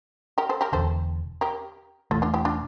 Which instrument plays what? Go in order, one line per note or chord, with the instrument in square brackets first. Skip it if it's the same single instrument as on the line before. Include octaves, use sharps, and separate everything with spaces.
[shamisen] G4 A#4
A4 C5
G4 A#4
[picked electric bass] E1 E2 D3 [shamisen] A4 C5
[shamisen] G4 A#4
[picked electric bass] E1 E2 E3 A3 [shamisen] F4 A4
[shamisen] D4 F4
E4 G4
D4 F4